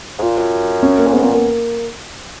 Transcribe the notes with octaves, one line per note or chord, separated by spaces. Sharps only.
G#2
A#2 F4
F#2
C#4
A#3
A#2
G#2 B3
A#2 B3
A#3